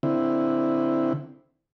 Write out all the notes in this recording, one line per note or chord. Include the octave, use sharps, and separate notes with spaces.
D3 C4 E4